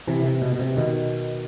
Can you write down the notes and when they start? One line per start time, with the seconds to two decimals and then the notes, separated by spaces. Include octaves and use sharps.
0.07 C3 E3
0.25 C3
0.42 B2
0.56 B2
0.59 C3
0.77 B2 D#3